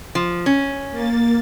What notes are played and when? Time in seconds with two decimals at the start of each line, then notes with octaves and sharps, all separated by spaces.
0.15 F3
0.46 C#4
0.91 A#3 A6